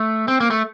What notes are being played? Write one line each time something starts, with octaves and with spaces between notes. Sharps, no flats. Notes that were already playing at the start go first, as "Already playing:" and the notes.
Already playing: A3
C4
A#3
A3